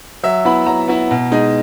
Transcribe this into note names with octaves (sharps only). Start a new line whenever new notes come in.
F#3 E5
B3 E4 B5
F#3 A#5
B3 E4
B2
G#3 D#4